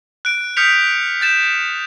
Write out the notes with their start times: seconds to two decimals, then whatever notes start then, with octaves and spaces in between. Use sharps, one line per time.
0.25 F#6 D7
0.57 D#6 F6 G6 B6 C#7 F7
1.21 G6 A6 E7